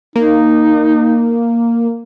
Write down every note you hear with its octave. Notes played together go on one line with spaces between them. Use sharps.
A#3 D#4